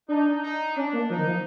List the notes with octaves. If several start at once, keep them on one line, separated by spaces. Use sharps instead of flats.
D4 D#4
D#4
C#4 D4
A#3
F3 D#4
D#3
F3